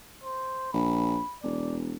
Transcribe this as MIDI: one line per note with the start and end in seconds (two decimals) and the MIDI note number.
0.24 0.68 72
0.73 1.19 34
0.73 1.38 83
1.43 1.95 28
1.43 1.77 74